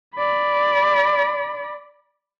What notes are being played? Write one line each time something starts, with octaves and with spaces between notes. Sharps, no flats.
D5 B5